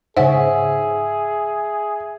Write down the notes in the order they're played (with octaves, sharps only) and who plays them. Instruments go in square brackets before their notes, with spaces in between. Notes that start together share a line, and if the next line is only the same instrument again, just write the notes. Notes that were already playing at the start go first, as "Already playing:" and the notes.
[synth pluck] G#2 C#3 [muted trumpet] G#4 [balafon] C5 F#5 [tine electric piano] E5